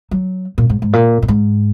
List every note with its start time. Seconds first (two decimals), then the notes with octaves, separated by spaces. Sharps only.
0.11 F#3
0.58 A#2
0.70 G#2
0.82 G#2
0.93 A#2
1.23 A#2
1.28 G#2